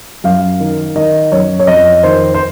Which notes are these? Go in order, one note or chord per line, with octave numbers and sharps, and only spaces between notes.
F#2 F5
D#3
D#3 D#5
F#2 C#5
C#5
F2 D#5
D#3 C5
C5